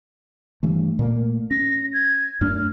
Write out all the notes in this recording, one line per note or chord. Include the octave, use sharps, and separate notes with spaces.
G2 E3 A3
A#2 A3 A#3
C#4 A#6
G#6
F#2 A3 D4 F6